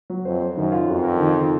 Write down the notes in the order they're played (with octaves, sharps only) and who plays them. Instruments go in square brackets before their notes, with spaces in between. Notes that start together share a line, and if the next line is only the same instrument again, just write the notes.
[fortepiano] F#3
[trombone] F2 [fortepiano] C5
[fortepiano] C5
[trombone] F#2 [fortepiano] D#3
[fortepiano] F4
[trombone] F2 [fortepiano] F#4
[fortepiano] A#4
D#3
D#3